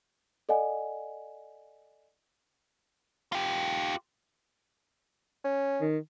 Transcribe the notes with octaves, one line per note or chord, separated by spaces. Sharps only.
A4 D5 D#5 F#5 G#5
F4 G4
C#4
D#3